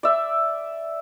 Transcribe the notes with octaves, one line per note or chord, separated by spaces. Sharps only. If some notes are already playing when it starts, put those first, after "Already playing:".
D5 E5